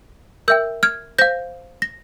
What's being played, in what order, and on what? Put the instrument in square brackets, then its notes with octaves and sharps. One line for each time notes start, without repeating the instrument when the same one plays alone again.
[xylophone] A#4 E5 G5 E6 G6
F6 G#6
C5 F5 G6 A#6
A#6